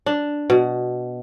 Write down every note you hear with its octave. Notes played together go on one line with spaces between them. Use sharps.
D4
B2